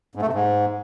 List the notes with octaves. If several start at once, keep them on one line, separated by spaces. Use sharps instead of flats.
G#2
A3
C3
G#2